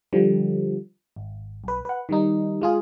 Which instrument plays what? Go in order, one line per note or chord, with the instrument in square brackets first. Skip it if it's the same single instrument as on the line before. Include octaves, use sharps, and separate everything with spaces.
[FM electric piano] D3 F3 G3
G#1
B1 B4
B4 F#5
D#3 G3 D#4
G#3 F4 G#4